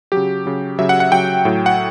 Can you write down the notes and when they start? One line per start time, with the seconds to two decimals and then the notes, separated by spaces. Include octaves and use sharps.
0.12 C#3 F#3 G4
0.46 C#3 F#3
0.79 C#3 F#3 E5
0.89 F#5
1.00 F#5
1.12 C#3 F#3 G5
1.45 A2 F#3
1.66 F#5